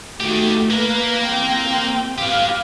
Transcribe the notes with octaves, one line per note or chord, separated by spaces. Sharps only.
D#3 A3 F#4 G4
A#3 A#4 B4
C4 G5
G4 B4 F5